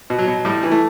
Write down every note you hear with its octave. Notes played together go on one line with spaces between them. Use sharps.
B2
F#3
B2
A2 G3
E3
A3